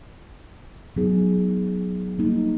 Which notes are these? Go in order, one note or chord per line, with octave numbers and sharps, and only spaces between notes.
F#3 B3 D#4 G#4
G3 A#3 D#4